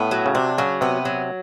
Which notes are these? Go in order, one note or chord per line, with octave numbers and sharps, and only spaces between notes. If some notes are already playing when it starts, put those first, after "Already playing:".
Already playing: A2 B3
F#3
C#3
C3 D4
C#3 F#3
C3 B3
F#3